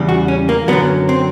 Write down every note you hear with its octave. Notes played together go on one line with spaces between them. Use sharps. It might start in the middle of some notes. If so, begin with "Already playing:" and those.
Already playing: E2 C#3 E3 G3
F#4
C#4
A#3
F#2 D3 F#3 B3
C4